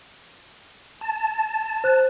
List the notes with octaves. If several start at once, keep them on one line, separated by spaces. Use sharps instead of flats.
A5
C5 F#6